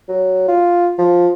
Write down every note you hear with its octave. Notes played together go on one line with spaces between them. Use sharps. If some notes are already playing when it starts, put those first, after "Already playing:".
F#3
F4
F3